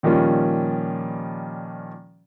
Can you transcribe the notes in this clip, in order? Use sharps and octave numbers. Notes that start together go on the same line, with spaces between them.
A#2 D#3 F3 G3 C#4 F4